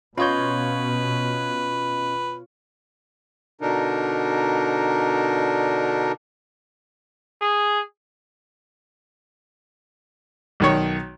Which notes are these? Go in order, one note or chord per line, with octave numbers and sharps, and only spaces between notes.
B2 C#4 F4 B4 C#5 D#5 G6
B2 D3 D4 D#4 A#4
G#4
B1 D#3 C#5